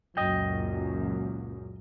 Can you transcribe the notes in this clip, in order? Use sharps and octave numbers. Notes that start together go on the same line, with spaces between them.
C#2 F#2 A#2 D#5 G5